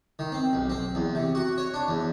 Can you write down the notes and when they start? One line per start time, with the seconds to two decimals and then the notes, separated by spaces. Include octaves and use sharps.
0.19 D#3
0.32 C4
0.53 B1
0.70 C4
0.95 E2
1.15 C3
1.35 F#4
1.58 C#5
1.74 D4
1.88 E2